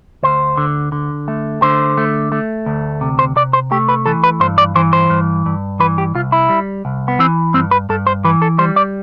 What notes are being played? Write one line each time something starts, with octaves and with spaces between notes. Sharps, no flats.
D2 C5
D3
D3
A3
D3 C5
A3
A3
D2
C3
C5
C3 D5
C5
A3 G4
B4
E3 A4
B4
G2 C5
D5
E3 C5
C5
G2
G2
E3 B4
G4
C2 F4
E4
G3
C2
B3
E3 C4
G2 C4
B4
G2 A4
C5
E3 B4
A4
G3 C5
D5